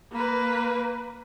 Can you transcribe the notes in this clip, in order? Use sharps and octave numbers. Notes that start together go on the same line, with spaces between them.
A#3 B4